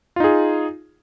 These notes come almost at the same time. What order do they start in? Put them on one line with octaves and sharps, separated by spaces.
F4 D#4 G#4